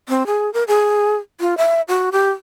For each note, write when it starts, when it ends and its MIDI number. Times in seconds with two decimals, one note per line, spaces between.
0.09 0.26 60
0.27 0.52 68
0.54 0.64 70
0.68 1.16 68
1.40 1.57 65
1.57 1.81 76
1.88 2.10 66
2.12 2.30 67